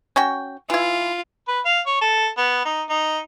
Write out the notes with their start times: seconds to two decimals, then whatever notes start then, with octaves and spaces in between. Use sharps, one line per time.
0.16 C#4 F#4 G5
0.70 E3 E4 F4
1.48 B4
1.65 F5
1.86 C#5
2.01 A4
2.37 B3
2.65 D#4
2.90 D#4